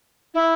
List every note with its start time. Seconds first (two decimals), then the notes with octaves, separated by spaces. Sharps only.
0.34 E4